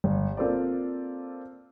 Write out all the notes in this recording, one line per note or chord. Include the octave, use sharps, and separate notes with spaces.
G1
A#3 C4 F4 A4 C5 D5